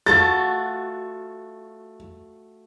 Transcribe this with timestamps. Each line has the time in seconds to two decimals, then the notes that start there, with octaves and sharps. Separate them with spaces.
0.06 A3 F4 F#4 A6